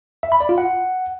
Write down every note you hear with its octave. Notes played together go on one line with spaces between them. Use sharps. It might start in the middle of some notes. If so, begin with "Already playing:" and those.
E5
B5
D5
F4
F#5